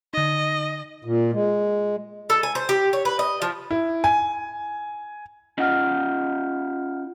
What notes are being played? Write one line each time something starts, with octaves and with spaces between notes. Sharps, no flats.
D3 D#4 D#5
A#2
G#3
A4
G#5
C5
G4
C#5
B4
D#5
F3
E4
G#5
C#4 D#4 F4 D#5 F#5 F6